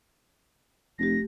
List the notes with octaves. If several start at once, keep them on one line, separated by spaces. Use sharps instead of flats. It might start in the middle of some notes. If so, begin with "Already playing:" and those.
F1 A3 G4 A#6